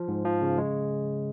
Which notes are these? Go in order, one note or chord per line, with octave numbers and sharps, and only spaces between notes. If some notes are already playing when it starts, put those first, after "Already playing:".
Already playing: F3
G#2
F3
C#3
G#3